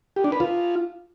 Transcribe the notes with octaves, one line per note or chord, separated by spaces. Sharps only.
G4
D4
B4
F4